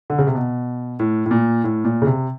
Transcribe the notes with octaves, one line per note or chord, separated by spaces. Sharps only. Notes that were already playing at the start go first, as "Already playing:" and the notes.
D3
C#3
C3
B2
A2
A2
A#2
A2
A#2
C#3
C3